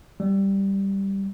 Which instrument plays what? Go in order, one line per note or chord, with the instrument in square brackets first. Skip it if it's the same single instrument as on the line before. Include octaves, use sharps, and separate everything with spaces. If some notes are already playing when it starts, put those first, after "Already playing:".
[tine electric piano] G3